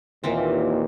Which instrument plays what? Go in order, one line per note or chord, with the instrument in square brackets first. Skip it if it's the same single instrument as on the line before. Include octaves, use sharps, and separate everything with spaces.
[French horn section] D#2 A#2 [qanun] E3 A#3 C4